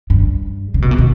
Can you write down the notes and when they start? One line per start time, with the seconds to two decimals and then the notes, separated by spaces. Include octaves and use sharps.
0.10 G2
0.74 C#3
0.82 B2
0.91 A#2
0.98 B2